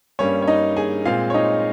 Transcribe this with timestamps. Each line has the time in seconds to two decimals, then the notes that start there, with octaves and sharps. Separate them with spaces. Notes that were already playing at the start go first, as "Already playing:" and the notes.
0.19 G2 G3 A#3 C#4 C#5
0.42 C#5
0.47 D#4 D#5
0.77 G#4 G#5
1.05 A#2 G#3 C4 F4 F5
1.30 C#5
1.34 D#4 D#5